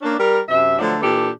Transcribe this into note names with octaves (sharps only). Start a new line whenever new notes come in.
A#3 C#4 D4
G3 A#4
F#2 C3 E5
D3 F3 F#3 A3 D4
A#2 E3 D4 G4 A4